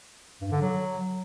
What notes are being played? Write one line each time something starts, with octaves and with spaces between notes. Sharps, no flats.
G2
D3
F#3